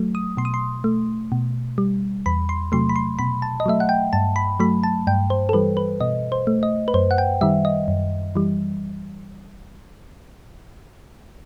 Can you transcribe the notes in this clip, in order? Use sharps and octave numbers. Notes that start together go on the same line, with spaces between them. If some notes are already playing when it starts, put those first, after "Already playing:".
Already playing: F#3 A3
D#6
B2 C6
D#6
C6
A3
B2
G3
E2 B5
C6
C3 F#3 A3 C6
B5
C6
B2 B5
A5
D#5
F#3 A3 E5
F#5
G5
G2 A5
B5
F#3 A3 B5
A5
G2 G5
C5
A4
E3 G3 B4
B4
B2 D#5
C5
A3
D#5
B4
F#2 C5
F#5
G5
D#3 G3 E5
D#5
F#2
E3 G3